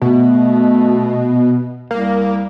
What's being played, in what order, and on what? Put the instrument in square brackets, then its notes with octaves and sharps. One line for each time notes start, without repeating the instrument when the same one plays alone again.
[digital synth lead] B2 [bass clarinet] A3
[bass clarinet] C2 [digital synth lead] A#3